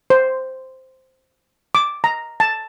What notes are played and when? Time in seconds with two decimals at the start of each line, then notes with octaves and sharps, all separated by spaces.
0.10 C5
1.75 D6
2.04 A#5
2.40 A5